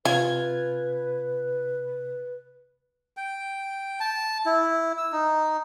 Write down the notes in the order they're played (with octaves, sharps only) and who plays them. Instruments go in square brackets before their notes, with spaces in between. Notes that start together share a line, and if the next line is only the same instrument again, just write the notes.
[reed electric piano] C3 [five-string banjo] F4 [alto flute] B4 [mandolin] G#5
[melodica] G5
A5
E4
E6
D#4